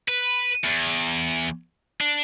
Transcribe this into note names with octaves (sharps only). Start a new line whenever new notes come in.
B4
E2
D4